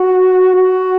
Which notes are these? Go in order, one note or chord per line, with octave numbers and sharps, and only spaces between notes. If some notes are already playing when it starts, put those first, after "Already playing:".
Already playing: F#4
F#4